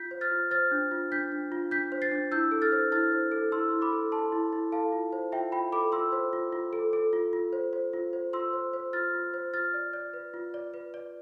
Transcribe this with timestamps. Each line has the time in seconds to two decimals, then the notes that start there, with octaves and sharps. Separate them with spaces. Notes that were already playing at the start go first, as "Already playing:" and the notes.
Already playing: F4 G6 B6
0.11 C5
0.21 F6 A6
0.31 F4
0.51 C5 F6 A6
0.71 D4
0.91 F4
1.12 D4 G6 B6
1.32 D4
1.52 F4
1.71 D4 G6 B6
1.92 C5
2.02 A6 C7
2.11 D4
2.32 E4 E6 G6
2.52 A4
2.62 F6 A6
2.72 C5
2.92 E4 F6 A6
3.12 C5
3.32 A4
3.52 E4 C6 E6
3.72 E4
3.82 B5 D6
3.92 A4
4.12 A4 A5 C6
4.32 E4
4.53 E4
4.72 A4 F5 A5
4.92 F4
5.12 C5
5.32 F4 E5 G5
5.52 F4 G5 B5
5.72 A4 B5 D6
5.92 F4 C6 E6
6.12 C5
6.33 F4
6.52 F4
6.73 A4
6.93 A4
7.13 F4
7.33 F4
7.53 C5
7.73 C5
7.93 F4
8.13 C5
8.33 F4 C6 E6
8.53 C5
8.73 C5
8.93 F4 F6 A6
9.14 F4
9.34 C5
9.54 F4 F6 A6
9.74 D5
9.93 D5
10.14 B4
10.34 F4
10.54 D5
10.74 B4
10.94 D5